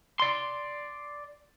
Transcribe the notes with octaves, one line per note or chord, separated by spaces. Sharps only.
D5 C6